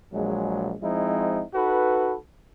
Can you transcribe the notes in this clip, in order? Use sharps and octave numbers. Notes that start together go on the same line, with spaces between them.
A#1 F#3 G#3
F3 G#3 C4 D#4 E4
D#4 F#4 A4 B4